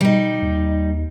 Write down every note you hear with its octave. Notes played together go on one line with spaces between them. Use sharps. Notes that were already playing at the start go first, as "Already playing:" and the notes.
B2 G3 D#4
D#2